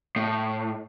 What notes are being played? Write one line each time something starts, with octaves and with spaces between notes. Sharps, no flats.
A2